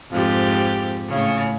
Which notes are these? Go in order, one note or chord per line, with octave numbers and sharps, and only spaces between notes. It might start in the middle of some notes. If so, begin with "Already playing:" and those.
F2 G#2 G4
A2 C#3